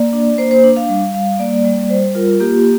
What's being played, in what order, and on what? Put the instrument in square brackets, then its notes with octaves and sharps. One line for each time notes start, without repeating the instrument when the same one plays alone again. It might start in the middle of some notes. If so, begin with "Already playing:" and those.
Already playing: [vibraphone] A#3 D5
D4
A#3 C5
C5
D4
F5
G3 F5
G3 F5
A#3 D5
G3
G3 C5
F4 A#4
A#3 G4